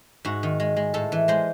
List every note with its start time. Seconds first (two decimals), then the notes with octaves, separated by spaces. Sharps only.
0.25 G#2 F#4
0.43 D#3
0.60 G#3
0.76 G#3
0.94 A2 A4
1.12 E3
1.28 G#3 C5